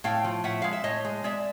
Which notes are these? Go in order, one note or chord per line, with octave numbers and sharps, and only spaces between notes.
A2 F5 G5
F3
A2 E5 F#5
G#3 F5
E5
A2 C#5 D#5
G#3
G#3 D5 E5